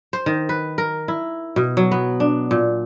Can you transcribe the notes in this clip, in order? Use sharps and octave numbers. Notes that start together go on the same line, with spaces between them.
C5
D#3
B4
A#4
E4
B2
F#3
B3
D4
A#2